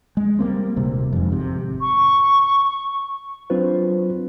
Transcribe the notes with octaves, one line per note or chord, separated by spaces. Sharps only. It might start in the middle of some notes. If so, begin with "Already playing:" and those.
G#3
G3 A3 A#3 C4
D#1 D2 C3 G3
F2 G#2
G#1 C3
C#6
F#3 C4 D4 F4 B4 C5